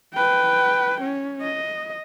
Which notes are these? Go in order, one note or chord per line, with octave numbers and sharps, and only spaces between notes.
B4 G5
C#4
D#5